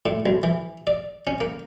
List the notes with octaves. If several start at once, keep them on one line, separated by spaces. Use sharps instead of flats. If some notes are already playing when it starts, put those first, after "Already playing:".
A2
B1
E3
D5
C#4
A#3